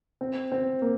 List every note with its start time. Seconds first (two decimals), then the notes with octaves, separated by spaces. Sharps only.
0.21 C4
0.52 C4
0.82 A#3